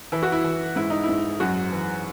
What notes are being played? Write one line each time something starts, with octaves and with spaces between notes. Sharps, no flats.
E3 E4
F#4
E4
E3
G#2 E4
D#4
E4
G#2
F#2 F#4
E3